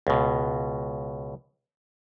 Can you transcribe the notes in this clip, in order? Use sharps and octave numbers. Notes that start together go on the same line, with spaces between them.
C#2 B2